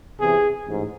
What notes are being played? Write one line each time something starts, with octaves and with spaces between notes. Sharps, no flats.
E2 C3 E3 G#4
A1 G#2